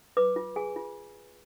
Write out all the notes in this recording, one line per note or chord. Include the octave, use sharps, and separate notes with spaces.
B4 D6
F4
G#4 G#5
F4